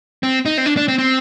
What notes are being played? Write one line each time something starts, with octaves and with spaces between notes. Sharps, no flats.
C4
D#4
C4
D4
D4
C4
C4